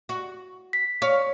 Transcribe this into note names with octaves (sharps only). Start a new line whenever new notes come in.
F#4
B6
C#5 F5